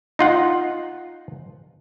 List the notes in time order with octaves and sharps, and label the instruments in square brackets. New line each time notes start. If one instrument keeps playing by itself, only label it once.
[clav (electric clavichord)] D#4 F4 F#5